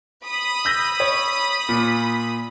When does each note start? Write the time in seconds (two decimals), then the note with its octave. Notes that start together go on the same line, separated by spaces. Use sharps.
0.25 B5 D#6
0.65 E6 G6 A#6
1.00 C#5
1.69 A#2